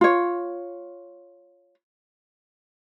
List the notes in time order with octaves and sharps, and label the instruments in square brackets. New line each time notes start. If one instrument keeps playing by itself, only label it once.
[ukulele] F4 C#5